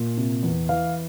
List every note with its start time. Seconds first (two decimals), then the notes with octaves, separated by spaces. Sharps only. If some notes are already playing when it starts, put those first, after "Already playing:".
Already playing: A#2
0.17 C3
0.43 E2
0.69 E3 F5